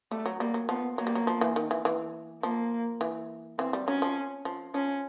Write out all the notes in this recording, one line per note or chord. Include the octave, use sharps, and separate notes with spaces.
G3 A3
F#3
G3 A#3
F#3
F3 B3
F#3 A#3
G3
F#3
F3
E3
D#3
E3
E3
F3 A#3
E3
E3 C4
G3
F#3 C#4
F3
F3
F3 C#4